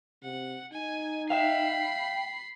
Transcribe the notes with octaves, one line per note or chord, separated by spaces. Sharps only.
C3 F#5
D#4 G#5
E5 F5 G5 B5 C7
G5